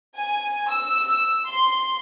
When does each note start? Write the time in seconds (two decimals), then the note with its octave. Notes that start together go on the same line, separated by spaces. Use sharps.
0.18 G#5
0.70 E6
1.47 C6